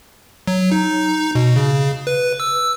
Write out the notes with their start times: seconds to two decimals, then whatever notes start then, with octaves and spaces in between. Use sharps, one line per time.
0.47 F#3
0.72 D#4
1.35 B2
1.56 C#3
2.07 B4
2.40 E6